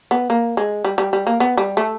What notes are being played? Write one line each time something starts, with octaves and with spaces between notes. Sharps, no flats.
B3
A#3
G#3
G3
G3
G3
A#3
B3
G3
A3